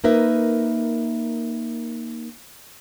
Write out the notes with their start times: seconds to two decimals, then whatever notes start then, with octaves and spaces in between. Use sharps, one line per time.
0.04 A#3 D#4 A#4 B4 E5